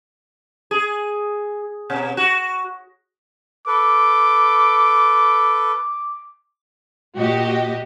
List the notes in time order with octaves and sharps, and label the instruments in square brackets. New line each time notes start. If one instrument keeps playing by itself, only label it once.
[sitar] G#4
B2
F#4
[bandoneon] A4 B4 [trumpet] D6
[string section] A#2 F#4 G4 D#5